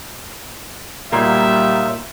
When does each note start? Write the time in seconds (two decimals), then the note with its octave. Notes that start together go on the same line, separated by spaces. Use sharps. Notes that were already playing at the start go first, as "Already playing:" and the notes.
1.12 A#2 F#3 G3 A#3 D#4 F4 E5